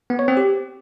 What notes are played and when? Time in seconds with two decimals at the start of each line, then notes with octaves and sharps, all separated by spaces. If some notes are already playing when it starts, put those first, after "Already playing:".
0.10 B3
0.19 C#5
0.28 C4
0.37 G4